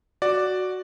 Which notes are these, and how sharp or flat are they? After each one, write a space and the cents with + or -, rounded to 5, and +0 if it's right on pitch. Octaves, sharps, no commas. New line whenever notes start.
F#4 +0 D5 +0